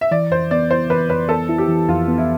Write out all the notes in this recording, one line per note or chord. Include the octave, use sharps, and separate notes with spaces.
E5
E3 D5
F2 C5
B3 D5
E4 C5
E3 B4
F2 B4
B3 A4
E4
G4
E3
F2 F4
B3
E4